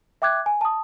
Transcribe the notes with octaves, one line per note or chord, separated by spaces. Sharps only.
E5 G5 D6 F#6 G#6
G#5
A5 D#6